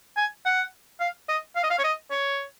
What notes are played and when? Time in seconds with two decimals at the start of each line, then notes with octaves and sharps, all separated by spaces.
0.17 G#5
0.45 F#5
1.00 F5
1.29 D#5
1.56 F5
1.63 D#5
1.70 F5
1.79 C#5
1.84 D#5
2.11 C#5